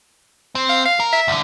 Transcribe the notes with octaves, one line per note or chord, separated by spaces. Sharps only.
C4
F5
F5
A#4
E5
C2 D3